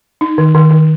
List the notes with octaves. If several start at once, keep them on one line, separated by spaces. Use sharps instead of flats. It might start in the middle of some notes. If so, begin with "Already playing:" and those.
D#4
D#3
D#3
D#3